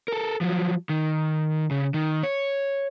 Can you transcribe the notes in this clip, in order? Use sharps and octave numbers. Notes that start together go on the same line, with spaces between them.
A4 A#4
F3 F#3
D#3
C#3
D#3
C#5